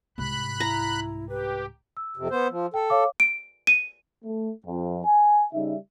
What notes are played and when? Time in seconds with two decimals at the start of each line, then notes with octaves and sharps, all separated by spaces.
0.18 C2 G#2 B5 F#6
0.60 E4 A#5
1.29 G4 B4
1.97 E6
2.17 F2 C3
2.31 B3 C5
2.50 F3
2.74 A4 G5
2.90 C#5 F5 D6
3.20 D7
3.67 D#7
4.24 A3
4.65 F2
5.05 G#5
5.53 C#3 G3 D#4 E5